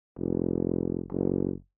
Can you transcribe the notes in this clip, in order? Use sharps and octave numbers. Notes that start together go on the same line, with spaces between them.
F1
F#1